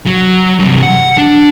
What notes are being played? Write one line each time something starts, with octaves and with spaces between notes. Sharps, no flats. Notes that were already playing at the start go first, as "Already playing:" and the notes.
F#3
G2 C3
F#5
D4